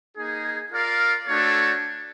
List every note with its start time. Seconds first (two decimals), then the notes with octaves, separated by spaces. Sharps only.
0.16 A#3 D#4 G#4
0.72 F4 A#4 D5 F5
1.28 A3 D4 F#4 A4 C#5